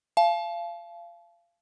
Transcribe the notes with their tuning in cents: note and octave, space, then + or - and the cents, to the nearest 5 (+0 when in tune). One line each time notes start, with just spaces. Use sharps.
F5 -25 A5 -35